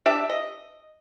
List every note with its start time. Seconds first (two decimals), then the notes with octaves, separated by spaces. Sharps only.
0.06 D4 G4 E5
0.29 D#5